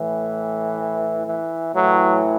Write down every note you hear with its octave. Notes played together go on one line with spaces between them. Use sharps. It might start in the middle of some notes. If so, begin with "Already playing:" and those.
Already playing: A2 E3
E3
A2 E3 F#3